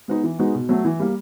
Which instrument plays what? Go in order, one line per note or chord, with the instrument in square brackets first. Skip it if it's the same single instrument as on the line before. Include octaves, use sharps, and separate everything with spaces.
[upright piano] G#3 B3 D#4
E3
G#3 B3 D#4 F#4
B2
F#3 A3
E3
G3 A#3